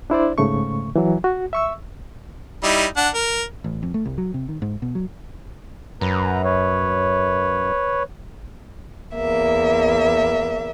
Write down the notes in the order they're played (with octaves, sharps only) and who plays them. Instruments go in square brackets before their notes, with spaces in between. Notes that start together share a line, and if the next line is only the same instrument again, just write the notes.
[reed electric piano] D4 E4 C5 D5
G#2 C#3 A3 C#6
E3 F#3
F#4
E5 C#6 E6
[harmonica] G3 D#4 E4
D4 F#5
A#4
[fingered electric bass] A1
F2
A3
C2
F#3
C3
D#3
G#2
B2
F#3
[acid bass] F#2 [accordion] B4 A#5
[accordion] B4 C#5
[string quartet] E2 A#3 E5